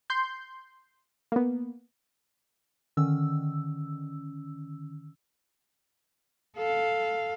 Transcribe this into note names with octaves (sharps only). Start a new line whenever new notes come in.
C6 G6
A#3 B3
D3 D#3 C#4 E6
A4 F5